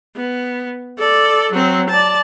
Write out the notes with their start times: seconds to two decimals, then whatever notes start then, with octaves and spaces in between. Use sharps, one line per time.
0.16 B3
0.98 A4 D5
1.52 F#3 C4
1.90 D5 A5